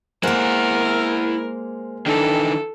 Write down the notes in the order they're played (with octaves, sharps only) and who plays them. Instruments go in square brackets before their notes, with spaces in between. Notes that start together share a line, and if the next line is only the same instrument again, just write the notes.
[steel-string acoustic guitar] G#3 A#3 [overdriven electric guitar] E4 F#5 [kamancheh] A#4 [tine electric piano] C5
[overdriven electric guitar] D#3 E3 [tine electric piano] D4 [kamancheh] A4